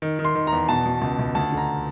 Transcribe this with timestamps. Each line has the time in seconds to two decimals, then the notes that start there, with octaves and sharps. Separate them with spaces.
0.02 D#3
0.19 D#3
0.25 C6
0.35 D#3
0.47 A#5
0.52 E2
0.69 B2 A5
0.85 B2
1.02 C#2
1.19 C#2
1.35 D2 A5
1.52 D3
1.57 A#5